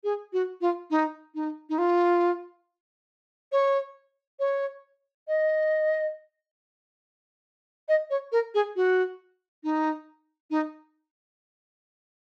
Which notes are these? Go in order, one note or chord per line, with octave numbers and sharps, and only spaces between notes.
G#4
F#4
F4
D#4
D#4
D#4
F4
C#5
C#5
D#5
D#5
C#5
A#4
G#4
F#4
D#4
D#4